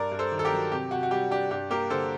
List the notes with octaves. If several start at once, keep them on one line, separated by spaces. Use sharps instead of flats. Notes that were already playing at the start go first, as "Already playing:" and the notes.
Already playing: G2 A#4 D5
G2
A4 C5
D#3
A4
G4 A#4
F#3
C3 G4
C3 F#4
F#4
G3 G4
D4 G4
G2 G4
A#3 G4 A#4
D3 A4 C5